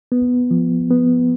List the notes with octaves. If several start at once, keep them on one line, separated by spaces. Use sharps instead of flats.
B3
F3
B3